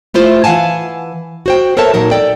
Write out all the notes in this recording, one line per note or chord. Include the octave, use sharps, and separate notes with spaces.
A3 E4 F4 C5
E3 F5 F#5 G#5 A5
F#4 C5 G5
A4 A#4 C5 C#5 E5 A5
A#2 F#3 D#4 A#4
A4 D5 G5